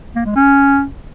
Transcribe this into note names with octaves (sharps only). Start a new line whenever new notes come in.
A#3
G#3
C#4